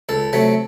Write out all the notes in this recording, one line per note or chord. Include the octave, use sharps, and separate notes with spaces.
C#2 A4
C3 F#3 A3